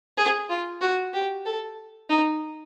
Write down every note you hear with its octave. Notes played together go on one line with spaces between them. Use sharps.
G#4
F4
F#4
G4
A4
D#4